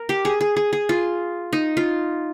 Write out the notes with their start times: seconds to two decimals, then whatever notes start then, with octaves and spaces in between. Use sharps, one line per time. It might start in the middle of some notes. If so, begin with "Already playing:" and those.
Already playing: A#4
0.09 G4
0.25 G#4
0.41 G#4
0.56 G#4
0.73 G#4
0.89 F4
1.53 D#4
1.77 F4